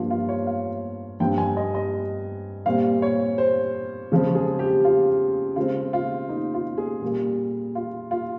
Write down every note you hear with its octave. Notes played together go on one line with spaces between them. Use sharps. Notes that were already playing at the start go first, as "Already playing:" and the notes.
Already playing: G2 F3 A#3 F4
F4
C#5
F5
G2 F3 C4 G5
G#5
D#5
D#5
A#2 G3 C4 F5
C#5
C5
C#3 F3 G#3 C4
G#4
G4
F4
C#3 G#3 C4 F4
F4
D#4
F4
G#4
A#2 G3 A#3
F4
F4